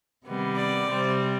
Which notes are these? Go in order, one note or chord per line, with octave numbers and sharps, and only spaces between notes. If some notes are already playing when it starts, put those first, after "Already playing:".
C3 D#3 G3 B3
D5
C3 G3 C4